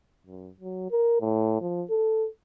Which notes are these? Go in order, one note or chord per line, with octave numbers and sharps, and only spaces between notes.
F#2
F#3
A#4
A2
F3
A4